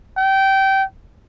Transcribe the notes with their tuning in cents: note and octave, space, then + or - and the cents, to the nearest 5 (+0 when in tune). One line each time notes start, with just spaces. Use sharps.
G5 -20